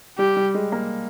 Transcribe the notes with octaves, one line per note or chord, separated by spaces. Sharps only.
G3 G4
G3
G#3
A#3